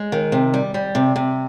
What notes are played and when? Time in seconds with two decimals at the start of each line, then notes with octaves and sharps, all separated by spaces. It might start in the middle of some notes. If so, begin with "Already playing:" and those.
Already playing: G#3
0.12 D#3
0.32 C3
0.54 G3
0.74 G3
0.95 C3
1.16 C3